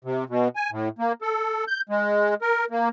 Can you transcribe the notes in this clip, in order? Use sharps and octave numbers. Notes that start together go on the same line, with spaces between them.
C3
B2
G#5
A2
A#3
A4
G6
G#3
A#4
A#3